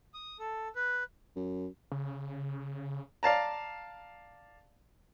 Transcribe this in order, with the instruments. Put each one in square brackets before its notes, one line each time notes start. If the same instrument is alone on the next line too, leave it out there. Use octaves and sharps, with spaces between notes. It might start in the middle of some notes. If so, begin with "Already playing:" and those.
[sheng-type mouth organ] D#6
A4
B4
[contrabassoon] F#2
[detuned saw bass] C#3
[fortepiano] D5 F5 A5 A#5